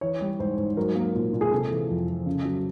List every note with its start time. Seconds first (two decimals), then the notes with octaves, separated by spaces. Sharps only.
0.01 E3 C#5
0.21 G3
0.39 G#2 C5
0.58 G#2
0.77 F#3 A#4
0.95 A#3
1.14 A#2
1.33 A#2
1.41 G#4
1.51 C3 A4
1.70 E3
1.89 F2
2.08 F2
2.26 C#3
2.45 F#3